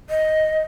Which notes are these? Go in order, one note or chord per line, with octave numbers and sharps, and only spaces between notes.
D#5